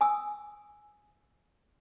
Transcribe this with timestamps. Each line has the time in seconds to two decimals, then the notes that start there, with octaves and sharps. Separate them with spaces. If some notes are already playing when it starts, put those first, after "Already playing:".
0.01 G#5 D#6 E6